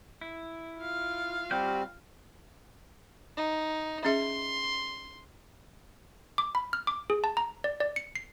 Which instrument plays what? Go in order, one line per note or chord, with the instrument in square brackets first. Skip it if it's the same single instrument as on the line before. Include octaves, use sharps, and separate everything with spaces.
[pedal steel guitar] E4
[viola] F4 F5
[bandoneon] G3 C4 [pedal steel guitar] F#4 G4 G6
[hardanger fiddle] D#4
[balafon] C#4 G#4 E5 [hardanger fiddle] C6
[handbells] D6
B5
F6
D6
G#4
A5
A#5
D5
D5
C#7
C7